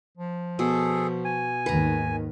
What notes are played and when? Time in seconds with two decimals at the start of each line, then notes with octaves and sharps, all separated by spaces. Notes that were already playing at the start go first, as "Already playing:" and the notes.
0.18 F3
0.59 B2 G#4 A4
1.25 G#5
1.66 D#2 G#2 D#3 B4 A#5